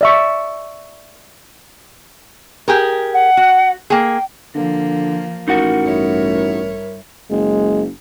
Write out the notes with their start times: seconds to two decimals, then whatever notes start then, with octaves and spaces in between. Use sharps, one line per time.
0.01 D5 E5 C#6
2.68 G4 G#4 A#4
3.13 F#5
3.37 F#4
3.90 A#3 G#4 G5
4.55 D3 F3 A#3
5.48 A1 D#4 F#4 A#4 F#5
5.84 G2 E4 C#5
7.30 F#1 G#3